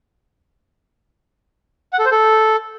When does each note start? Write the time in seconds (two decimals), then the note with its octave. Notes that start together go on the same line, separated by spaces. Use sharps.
1.93 F#5
1.99 A4
2.05 C5
2.11 A4